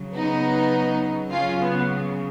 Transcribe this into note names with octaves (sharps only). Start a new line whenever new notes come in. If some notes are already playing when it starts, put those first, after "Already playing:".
Already playing: C#3 F#3
B3 D#4
C#3 F#3 C#4 F4
B3